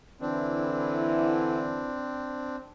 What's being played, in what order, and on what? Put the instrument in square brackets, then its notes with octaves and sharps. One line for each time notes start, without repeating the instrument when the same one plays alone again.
[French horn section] D3 E3 [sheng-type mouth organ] C4 D4 [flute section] E4